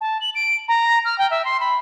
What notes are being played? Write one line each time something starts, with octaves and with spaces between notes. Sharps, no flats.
A5
F#7
D7
A#5
F6
G5
E5
C6
B5